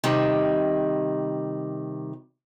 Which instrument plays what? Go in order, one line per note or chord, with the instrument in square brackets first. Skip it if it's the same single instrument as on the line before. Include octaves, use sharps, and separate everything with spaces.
[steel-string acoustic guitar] C3 D#3 G3